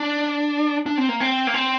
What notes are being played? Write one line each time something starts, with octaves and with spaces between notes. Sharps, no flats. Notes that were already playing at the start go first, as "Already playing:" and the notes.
Already playing: D4
D4
C4
A#3
C4
A#3
C4